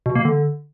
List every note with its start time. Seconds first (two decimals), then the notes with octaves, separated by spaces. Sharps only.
0.06 B2
0.15 A#3
0.25 D3